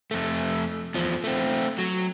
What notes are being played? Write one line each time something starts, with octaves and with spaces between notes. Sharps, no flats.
F2 A3
E2 F3
A3 C4
F#3